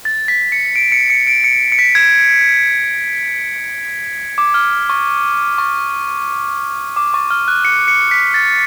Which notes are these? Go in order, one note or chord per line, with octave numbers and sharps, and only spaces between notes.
A6
B6
C#7
D7
C#7
C#7
D7
C#7
C#7
B6
G#6
D6
F6
C#6
C#6
D6
C#6
F6
F#6
C#7
C#7
B6
A6